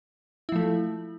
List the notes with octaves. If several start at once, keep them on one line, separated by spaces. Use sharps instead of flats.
F3 A3 E4